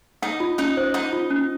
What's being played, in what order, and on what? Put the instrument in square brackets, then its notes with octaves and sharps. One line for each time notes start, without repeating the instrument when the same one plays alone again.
[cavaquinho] D#4 D#5 [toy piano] F#5
[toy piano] F4
[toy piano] C#4 [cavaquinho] D#4 D#5
[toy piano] C5
[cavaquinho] D#4 D#5 [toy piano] F#5
[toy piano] F4
C#4